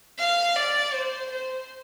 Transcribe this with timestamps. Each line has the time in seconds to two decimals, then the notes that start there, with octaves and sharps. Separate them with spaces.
0.19 F5
0.56 D5
0.93 C5
1.31 C5